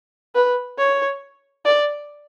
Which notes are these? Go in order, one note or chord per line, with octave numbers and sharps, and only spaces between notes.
B4
C#5
D5